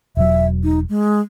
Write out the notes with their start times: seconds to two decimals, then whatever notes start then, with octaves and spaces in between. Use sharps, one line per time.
0.17 E1 F#3 E5
0.63 D#4
0.89 G#3